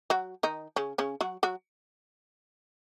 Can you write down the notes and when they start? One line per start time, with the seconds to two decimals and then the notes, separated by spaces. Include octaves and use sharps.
0.10 F#3 F#4
0.43 D#3 D#4
0.76 C#3 C#4
0.98 C#3 C#4
1.21 F#3 F#4
1.43 F#3 F#4